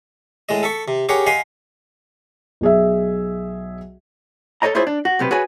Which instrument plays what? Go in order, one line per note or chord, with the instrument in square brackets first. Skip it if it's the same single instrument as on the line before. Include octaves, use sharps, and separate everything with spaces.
[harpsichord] A2 G#3 D#5
A4 B5 C#6
C3
G4 G#4 A#4 C#5 F#5
D#5 F5 F#5 G#5 B5 C6
[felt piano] B1 G#4 E5
[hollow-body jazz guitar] A4 C5 C#5 D#5 A#5
E4 F4 G#4 C5 C#5
D4
F#4
B1 C3 G4 B4
F#4 G#4 B4 C#5 G#5